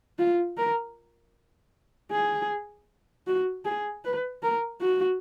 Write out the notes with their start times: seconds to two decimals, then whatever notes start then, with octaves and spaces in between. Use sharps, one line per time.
0.19 F4
0.58 A#4
2.11 G#4
3.27 F#4
3.65 G#4
4.04 B4
4.43 A#4
4.81 F#4